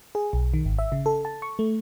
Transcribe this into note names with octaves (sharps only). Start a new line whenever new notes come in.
G#4
B1
D#3
G#1
E5
C#3
A4
A5
C#6
A3